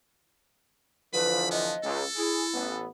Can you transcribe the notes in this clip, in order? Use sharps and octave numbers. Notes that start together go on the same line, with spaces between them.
D3 E3 F3 B4 B5
B3 D#5
C#2 A4
E4 G#4
A1 B3